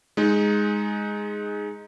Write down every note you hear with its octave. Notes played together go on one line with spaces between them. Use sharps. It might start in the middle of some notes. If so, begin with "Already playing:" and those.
G#3 D#4